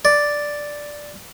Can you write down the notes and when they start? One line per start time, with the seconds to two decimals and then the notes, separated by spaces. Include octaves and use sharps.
0.05 D5